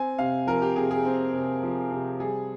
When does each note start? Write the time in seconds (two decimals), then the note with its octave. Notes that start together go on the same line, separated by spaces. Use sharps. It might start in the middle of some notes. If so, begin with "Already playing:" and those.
Already playing: C4 G#5
0.18 C3 F5
0.47 F3 A#4
0.62 G4
0.76 C3 G#4
0.91 G#4
1.05 C4
1.33 C3
1.63 F3
1.91 C3
2.20 G3 G#4